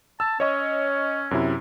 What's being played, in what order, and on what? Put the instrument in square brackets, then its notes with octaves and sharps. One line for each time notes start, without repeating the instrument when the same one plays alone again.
[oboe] A5 [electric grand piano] E6
[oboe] C#4 [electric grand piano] C#5 D#5 C#6
[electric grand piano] F#2 C3 E4